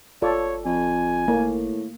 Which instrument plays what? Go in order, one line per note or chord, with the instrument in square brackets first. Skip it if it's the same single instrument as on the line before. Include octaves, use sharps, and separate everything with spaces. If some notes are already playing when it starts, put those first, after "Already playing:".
[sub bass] G1 [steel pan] F4 A4 D5 [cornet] C#5
[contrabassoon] F2 [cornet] G#5
[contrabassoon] A2 [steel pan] A#3